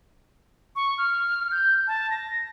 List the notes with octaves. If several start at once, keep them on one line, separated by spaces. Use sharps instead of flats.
C#6
F6
G6
A5
A#6